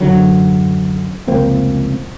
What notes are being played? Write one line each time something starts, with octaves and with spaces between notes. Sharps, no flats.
F#2 D3 F#3
F1 C#2 A#3 C4